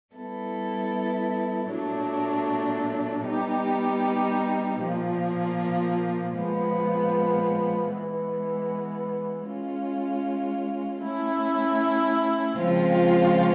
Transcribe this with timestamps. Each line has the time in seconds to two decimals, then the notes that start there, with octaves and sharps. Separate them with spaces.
0.14 G3 B3 E4 A4
1.70 A#2 F#3 A3 D4
3.25 G3 B3 D#4 G4
4.80 A#2 F3 A#3
6.35 A#2 F3 G#3 B3
7.91 E3 G#3 B3
9.46 G#3 C#4 F4
11.01 A3 C#4 E4
12.56 C#3 F3 G#3 C4 F4